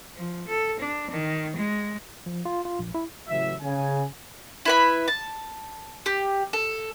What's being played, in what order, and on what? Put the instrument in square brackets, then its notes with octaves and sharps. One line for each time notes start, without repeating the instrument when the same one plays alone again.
[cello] F3
A4
D4
D#3
G#3
[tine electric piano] F3
F4
F4
A#1
E4
[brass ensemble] A1 C#3 E3 F#3 E5
C#3 G#5
[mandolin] E4 B4 B5
A5
G4
A4